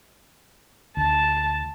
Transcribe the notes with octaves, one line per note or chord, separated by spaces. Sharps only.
D2 A5